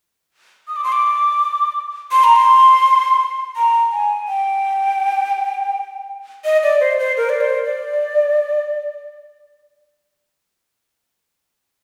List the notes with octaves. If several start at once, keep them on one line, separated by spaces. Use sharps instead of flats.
D#6
D6
C6
D6
C6
A#5
C6
A#5
G#5
G5
D#5
D5
C5
C5
A#4
D5
C5
D5